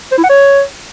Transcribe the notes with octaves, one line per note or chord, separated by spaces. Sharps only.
C5
E4
F#5
C#5